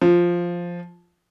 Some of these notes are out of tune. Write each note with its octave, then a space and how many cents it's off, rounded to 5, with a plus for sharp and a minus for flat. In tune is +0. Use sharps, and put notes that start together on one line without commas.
F3 +0